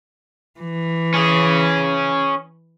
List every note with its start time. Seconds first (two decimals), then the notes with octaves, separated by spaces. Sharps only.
0.60 E3
1.14 C#4 G#4